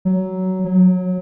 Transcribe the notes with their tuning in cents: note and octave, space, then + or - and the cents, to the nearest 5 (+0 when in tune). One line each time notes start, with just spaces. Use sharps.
F#3 +15
F#3 -20